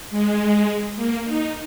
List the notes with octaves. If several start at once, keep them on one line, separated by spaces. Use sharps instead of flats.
G#3
A#3
D#4